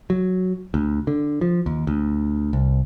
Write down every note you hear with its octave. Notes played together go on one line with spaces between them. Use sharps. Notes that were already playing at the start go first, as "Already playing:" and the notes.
F#3
D2
D3
F3
D#2
D2
C2